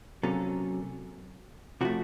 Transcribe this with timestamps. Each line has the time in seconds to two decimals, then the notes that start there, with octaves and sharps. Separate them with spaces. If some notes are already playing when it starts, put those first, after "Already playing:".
0.23 C3 F#3 A#3 C#4 A4
1.81 C3 F3 A3 F#4